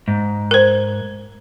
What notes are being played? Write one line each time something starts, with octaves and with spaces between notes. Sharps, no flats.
G#2
A#4 C5